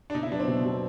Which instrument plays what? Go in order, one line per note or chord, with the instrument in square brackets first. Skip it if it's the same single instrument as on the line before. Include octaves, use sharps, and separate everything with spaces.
[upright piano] D4
[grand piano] B2 [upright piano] D#4
[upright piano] E4
[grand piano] F#3 B3 [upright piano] D4
[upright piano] C4
[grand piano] B2
F#3 B3